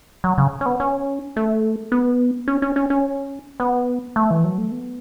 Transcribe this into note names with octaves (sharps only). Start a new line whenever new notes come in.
F#3
C#3
C#4
B3
C#4
A3
B3
C#4
C#4
C#4
C#4
B3
A3
E3
F#3
A3
B3